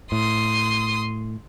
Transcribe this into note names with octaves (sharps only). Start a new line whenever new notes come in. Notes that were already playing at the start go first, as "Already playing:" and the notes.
A2 C6 D#6